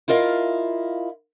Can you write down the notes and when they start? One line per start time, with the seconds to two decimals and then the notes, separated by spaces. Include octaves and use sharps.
0.08 E4 F4 A#4 D#5 F5